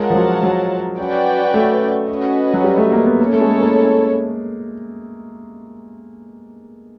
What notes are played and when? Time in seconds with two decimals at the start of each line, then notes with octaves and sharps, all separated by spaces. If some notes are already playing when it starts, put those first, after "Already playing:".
Already playing: G#3 F4 A#4 C#5 F#5 A5
0.10 F3
0.15 F#3
0.43 F#3
0.99 C#4 F#4 B4 D5 G5
1.54 A3
2.09 C#4 F#4 B4 D#5
2.53 F#3
2.64 G3
2.78 A3
2.92 A#3
3.06 B3
3.20 A#3 C#4 E4 A4 C#5
3.33 A3
3.41 G#3
3.47 A3
3.61 A#3